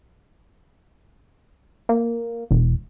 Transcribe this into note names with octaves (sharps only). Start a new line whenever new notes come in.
A#3
E1